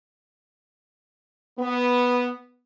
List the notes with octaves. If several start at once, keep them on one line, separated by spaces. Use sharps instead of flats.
B3